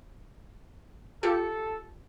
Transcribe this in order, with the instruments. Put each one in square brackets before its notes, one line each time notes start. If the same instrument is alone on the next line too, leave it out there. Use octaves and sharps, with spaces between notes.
[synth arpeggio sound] F4 G4 C#7 [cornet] A4